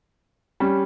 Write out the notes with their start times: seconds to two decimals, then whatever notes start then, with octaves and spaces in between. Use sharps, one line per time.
0.60 G3 C#4